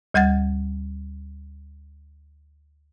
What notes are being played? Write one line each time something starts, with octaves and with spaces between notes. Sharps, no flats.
D2 G3 F#5 G#6 A6